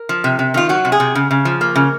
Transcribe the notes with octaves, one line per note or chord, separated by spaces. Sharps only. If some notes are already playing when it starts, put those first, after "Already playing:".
Already playing: A#4
F3
C3
C3
D#3 F4
F#3 F#4
C3
G#4
C3
C#3
C#3
F3
A#3
C#3